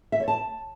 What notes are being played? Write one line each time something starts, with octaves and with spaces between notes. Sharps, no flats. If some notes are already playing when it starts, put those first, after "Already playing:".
E5
C#5
A5